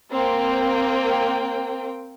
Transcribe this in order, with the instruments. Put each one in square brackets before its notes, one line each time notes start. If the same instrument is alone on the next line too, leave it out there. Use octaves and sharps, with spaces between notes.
[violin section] A#3 C4 G5